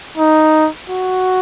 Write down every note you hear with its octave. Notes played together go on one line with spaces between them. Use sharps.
D#4
F#4